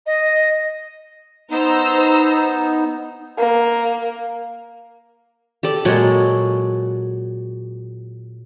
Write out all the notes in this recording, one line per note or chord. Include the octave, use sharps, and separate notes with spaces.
D#5
B3 D#4 C5 A#5 E6
A#3
G4 A4 D5
A#2 F#3 G#3